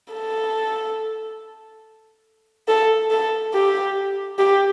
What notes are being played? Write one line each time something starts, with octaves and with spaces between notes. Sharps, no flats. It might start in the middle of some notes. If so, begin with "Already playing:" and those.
A4
A4
A4
G4
G4